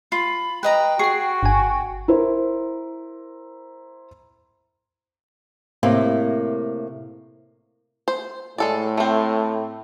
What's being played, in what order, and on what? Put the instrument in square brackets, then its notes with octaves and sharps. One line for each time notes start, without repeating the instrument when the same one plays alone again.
[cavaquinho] F4 [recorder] B5
[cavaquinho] B4 D#5 A#5 [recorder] G5
[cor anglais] F#4 [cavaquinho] G#4 [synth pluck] C#6 C7
[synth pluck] G1 G#5
[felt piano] E4 A#4 C5
[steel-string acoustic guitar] A2 C3 A#3
[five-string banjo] C5
[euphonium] A2 [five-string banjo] G#3 A4 D5
[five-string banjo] A3 C4